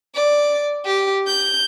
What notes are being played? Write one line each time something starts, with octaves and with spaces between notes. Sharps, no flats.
D5
G4
G6